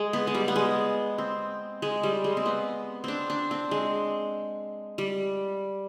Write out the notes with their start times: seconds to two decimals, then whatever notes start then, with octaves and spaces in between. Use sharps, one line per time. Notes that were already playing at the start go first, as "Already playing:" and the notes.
Already playing: G#3
0.13 B3
0.27 G#3
0.35 G3
0.48 B3
0.56 G#3
1.18 C4
1.82 G#3
2.03 G3
2.24 G#3
2.37 C4
2.46 B3
3.04 C4 D4
3.30 D4
3.51 C4
3.71 G#3
4.98 G3